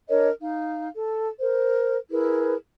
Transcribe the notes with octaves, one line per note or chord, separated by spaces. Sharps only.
D4 A#4 C#5 D#5
D#4 F5
A4
A#4 C5
E4 G#4 A#4 B4